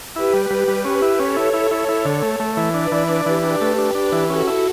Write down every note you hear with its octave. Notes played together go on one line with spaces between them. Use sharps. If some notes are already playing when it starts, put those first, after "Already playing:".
E4 G4 B4
G3
G3
G3
C#4
E4
C#4 A4 C#5
E4
E4
E4
E4
D3
A3
A3
E3
D4 B4 D5
E3
D4
E3 G4 B4
D4
A3
D4
D4
E3
C#4 F#4 A4
E4